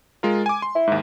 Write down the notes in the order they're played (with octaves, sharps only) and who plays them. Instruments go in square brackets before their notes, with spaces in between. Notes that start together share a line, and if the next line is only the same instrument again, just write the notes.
[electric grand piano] G#3 F4 A#4
G#5 D6
C6
[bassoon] E4
[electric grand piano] D#2 G#2